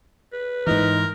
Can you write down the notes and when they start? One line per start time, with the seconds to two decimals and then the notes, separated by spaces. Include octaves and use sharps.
0.33 B4
0.67 G#2 E3 D#4 A#4